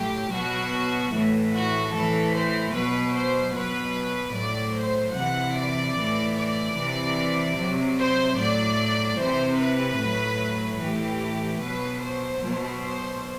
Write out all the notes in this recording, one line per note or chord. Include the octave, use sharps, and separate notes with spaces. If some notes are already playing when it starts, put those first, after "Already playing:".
Already playing: A2 F#3 G4
B2 F#3 F#4
A2 E3
F#4
A2 E3 A4
C5
B2 F#3 B4
C5
B2 F#3 B4
A2 F#3 D5
C5
C3 E3 F#5
D5
A2 E3
D5
C3 E3
C3 F#3
C5
A2 F#3 D5
C3 E3 C5
B4
A2 F#3
A2 E3 G4
B2 F#3 B4
C5
B2 F#3
C5